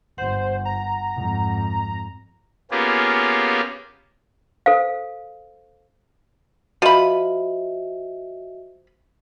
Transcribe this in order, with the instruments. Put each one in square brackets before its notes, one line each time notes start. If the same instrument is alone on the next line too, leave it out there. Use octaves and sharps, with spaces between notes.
[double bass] G1 [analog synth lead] C5 [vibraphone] F#5
[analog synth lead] A#5
[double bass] F2 G#2
[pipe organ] A#3 B3 C#4 F4 G4 G#4
[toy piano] A4 C5 F5
[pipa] F3 B5 [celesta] F#4 D#5 E5